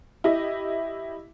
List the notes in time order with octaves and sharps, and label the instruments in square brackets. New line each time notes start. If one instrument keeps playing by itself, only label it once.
[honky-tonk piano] E4 G4 D#5